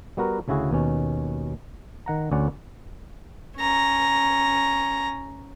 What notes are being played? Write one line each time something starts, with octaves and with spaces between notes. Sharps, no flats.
G3 B3 F#4 A#4
D2 C#3 E4 F#4 G#4
D#2 B2 C#4
D#3 F#5 A#5
D2 C#4 D5 F#5
C#4 A#5